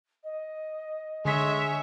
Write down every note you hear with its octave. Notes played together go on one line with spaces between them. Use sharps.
D#5
D3 G#3 C#5 E5 B6